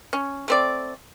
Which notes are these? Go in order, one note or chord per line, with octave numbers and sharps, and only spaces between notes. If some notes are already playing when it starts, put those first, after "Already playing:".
C#4
A3 C4 D5